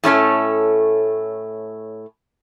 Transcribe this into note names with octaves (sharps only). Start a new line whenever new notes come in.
A2 A3 C#4 A4